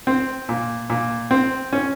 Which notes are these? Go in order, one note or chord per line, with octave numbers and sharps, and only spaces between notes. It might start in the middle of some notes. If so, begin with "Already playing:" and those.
C4
A#2
A#2
C4
C#4